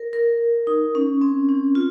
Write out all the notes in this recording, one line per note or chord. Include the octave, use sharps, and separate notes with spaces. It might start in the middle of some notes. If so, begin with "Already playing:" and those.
Already playing: A#4
A#4
D#4
C#4
C4
C#4
F4